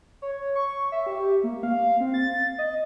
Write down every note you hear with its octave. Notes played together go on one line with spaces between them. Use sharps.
C#5
C#6
E5
G4
A#3
F5
C4
A6
D#5